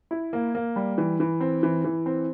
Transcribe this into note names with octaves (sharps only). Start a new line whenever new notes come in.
E4
A#3
A#3
G3
E3
E3
C4
E3
E3
C4